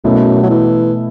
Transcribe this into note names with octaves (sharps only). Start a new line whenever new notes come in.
F#2 B2 A3 E4
F#3
E3